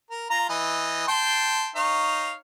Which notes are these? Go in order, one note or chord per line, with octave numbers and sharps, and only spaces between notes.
A#4
F4 A#5
E3 D#5
G5 A5 C6
D#4 C#5 F5